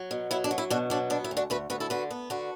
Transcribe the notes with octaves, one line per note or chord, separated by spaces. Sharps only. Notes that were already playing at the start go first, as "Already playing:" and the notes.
Already playing: F#3
B2
F#3 E4
D4
F#3
E4
B2 D4 F#4
F#3 D4
B3 D4
E4
D2
D4 F#4
D2 F#4 B4
D2 F#4 B4
E4 A4
D3 F#4 B4
B3
D3 F#4 B4